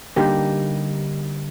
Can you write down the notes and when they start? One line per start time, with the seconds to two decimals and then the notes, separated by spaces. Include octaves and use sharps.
0.16 D3 G3 A#3 D#4 G4